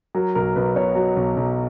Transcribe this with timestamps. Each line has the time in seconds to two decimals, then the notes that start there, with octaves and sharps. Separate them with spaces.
0.15 F#3 A#4
0.35 B1 A#4
0.56 B1 B4
0.76 B2 C#5
0.95 F#3
1.16 B1
1.37 B1